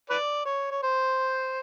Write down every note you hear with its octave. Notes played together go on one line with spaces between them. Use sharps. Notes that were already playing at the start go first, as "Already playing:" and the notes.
B4 D5
C#5
C#5
C5